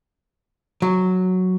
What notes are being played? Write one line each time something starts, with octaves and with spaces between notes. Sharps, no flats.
F#3